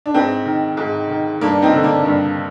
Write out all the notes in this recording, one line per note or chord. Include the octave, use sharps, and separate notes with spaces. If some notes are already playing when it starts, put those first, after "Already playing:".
D4
G#2 C4
D#3
G#2
D#3
G2 A#3 D4
C4 D#4
D3
A#3 D4
G2